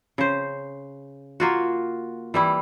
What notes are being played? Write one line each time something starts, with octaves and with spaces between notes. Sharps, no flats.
C#3 C5
A#3 F4 F#4
E3 G3 E4